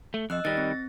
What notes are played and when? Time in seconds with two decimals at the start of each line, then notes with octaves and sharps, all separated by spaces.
0.14 A3
0.30 F2 D#5 E6 F#6
0.45 D#3 G3 A6 A#6
0.57 C4